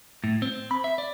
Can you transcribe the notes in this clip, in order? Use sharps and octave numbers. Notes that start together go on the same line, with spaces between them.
A2
C4
B5
E5
D5